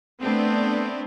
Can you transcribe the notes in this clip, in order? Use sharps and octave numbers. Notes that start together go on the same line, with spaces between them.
A3 B3 C4 D4